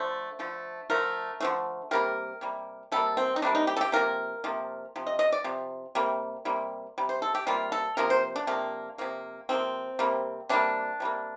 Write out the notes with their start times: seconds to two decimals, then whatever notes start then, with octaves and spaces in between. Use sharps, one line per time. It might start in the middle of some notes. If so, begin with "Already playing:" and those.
Already playing: D3 F3 A3 C5
0.39 D3 F3 A3
0.90 D3 F3 A3 A#4
1.40 D3 F3 A3
1.91 C3 G3 A#3 A#4
2.41 C3 G3 A#3
2.92 C3 G3 A#3 A4
3.17 C4
3.36 D#4
3.42 C3 G3 A#3 D4
3.55 D#4
3.67 G4
3.76 A4
3.81 G4
3.92 C3 F3 A#3 A#4
4.44 C3 F3 A#3
4.96 C3 F3
5.07 D#5
5.19 D#5
5.32 D5
5.44 C3 F3
5.95 C3 G3 A#3
6.45 C3 G3 A#3
6.98 C3 G3
7.09 C5
7.22 A4
7.35 G4
7.47 C3 G3 A#3 F4
7.72 A4
7.97 C3 F3 A#3 A#4
8.10 C5
8.36 D4
8.47 C3 F3 A#3
8.98 C3 F3 A#3
9.49 C3 F3 A#3 C4
9.99 C3 G3 A#3
10.49 C3 G3 A#3 D4
11.00 C3 G3 A#3